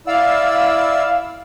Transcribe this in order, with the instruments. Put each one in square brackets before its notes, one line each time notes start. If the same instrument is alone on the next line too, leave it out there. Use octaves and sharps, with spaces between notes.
[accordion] E4 D5 E6 [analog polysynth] F5